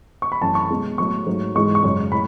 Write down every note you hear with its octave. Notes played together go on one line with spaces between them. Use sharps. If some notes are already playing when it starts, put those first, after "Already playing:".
C#6
B5
F#2 E3 A3 A5
C#6
B2 G#3
A2 F#3 A3 C#6
G#2 F#3 A3
G#2 E3 G#3 C#6
C#6
F#2 C#3 G#3
A2 B5